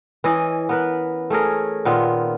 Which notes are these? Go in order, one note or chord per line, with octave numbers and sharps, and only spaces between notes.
E3 C#4 E4 D#5
B3 A#4 B4
A3 C#4 G#4 A#4
A#2 D#3 B3 F4